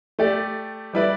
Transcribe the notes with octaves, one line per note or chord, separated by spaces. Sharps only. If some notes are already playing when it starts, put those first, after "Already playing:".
A3 G4 D5
G3 E4 B4 D5